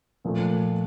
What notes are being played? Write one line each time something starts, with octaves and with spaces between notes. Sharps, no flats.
A#2 F3 A3